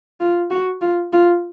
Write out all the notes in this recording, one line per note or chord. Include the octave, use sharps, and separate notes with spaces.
F4
F#4
F4
F4